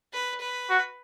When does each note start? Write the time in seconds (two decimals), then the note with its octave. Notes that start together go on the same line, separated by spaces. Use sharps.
0.14 B4
0.41 B4
0.70 F#4